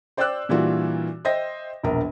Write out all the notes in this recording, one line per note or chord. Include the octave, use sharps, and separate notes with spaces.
C5 D5 G5 D6 E6 F#6
A#2 E3 G3 D4 F4 F#4
C5 D#5 E5 G5 A#6
E1 A#1 A#4